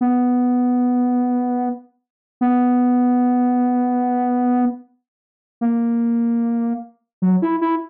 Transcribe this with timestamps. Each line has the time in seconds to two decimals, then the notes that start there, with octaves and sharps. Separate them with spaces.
0.01 B3
2.41 B3
5.61 A#3
7.22 F#3
7.42 E4
7.61 E4